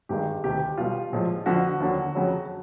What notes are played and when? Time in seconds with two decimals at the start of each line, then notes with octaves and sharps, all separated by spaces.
0.09 G#1 G2 D#3 G#3 G4
0.44 E1 D2 C3 D#3 G4
0.78 B1 B2 G3 F4
1.12 A#1 A2 F3 G#3
1.46 F2 D3 F3 F#4
1.80 D#2 D3 F#3
2.15 F2 C#3 F#3